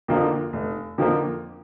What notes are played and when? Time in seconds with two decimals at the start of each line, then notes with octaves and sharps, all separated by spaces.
0.08 F2 D3 F3 A#3
0.53 F1
0.98 F2 D3 F3 A#3